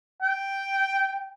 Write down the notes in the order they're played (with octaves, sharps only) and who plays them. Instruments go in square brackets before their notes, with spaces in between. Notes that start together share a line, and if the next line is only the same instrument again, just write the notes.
[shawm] G5